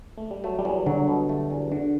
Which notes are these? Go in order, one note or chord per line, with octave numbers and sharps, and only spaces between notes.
A3
G3
F#3 A3
G3
E2 F#3
D3 F#3
B2
A3
E2
D3 F#4